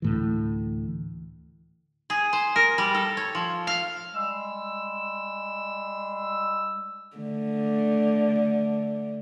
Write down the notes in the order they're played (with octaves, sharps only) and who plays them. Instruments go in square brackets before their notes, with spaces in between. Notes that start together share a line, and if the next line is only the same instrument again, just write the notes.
[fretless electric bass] D2 A2 E3
[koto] G#4
C5
A#4
G3
A4
C#5
F3
F5
[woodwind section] G3 G#3 E6
[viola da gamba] D3 A3